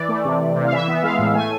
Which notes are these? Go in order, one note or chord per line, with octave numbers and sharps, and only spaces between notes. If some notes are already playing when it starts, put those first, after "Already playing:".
Already playing: E3 D5
A3
C3
C3
C3
F5
E3 E5
B3
G#3 F5
A2
A3 G#5